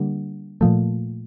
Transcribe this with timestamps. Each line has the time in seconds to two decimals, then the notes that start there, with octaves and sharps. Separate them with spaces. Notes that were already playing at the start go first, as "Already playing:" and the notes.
Already playing: D3 G3 A#3
0.61 A#2 F3 A3